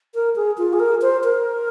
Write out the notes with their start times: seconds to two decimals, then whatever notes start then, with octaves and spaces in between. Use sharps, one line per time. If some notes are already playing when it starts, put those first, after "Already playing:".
0.14 A#4
0.36 G#4
0.58 F4
0.73 G#4
0.80 A#4
1.02 C5
1.24 A#4